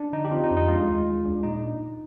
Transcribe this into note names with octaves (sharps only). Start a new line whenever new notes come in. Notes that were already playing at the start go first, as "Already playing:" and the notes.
Already playing: D4
D3 D#4
G4
C4 F4
D#4
F2
D#4
G#3 F4
D#2
G#3
D4
A#2 D#4